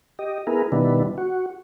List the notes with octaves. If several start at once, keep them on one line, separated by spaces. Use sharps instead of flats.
G4 D#5
B3 E4 G#4 A#4
B2 D#3 G3 B3 D4 E4
F#4